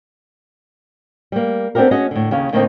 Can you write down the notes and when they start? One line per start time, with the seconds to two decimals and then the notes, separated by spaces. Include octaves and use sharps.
1.32 G3 A#3
1.75 B3 C4 D4 F#4 G4 A#4
1.91 C#4 F#4 G#4 D#5
2.11 A2 D3
2.31 D#2 C#3 F5
2.53 A2 D3 D#3 A#3 C4 D#4